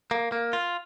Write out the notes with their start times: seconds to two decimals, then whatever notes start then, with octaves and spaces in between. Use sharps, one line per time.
0.11 A#3
0.32 A#3
0.53 F4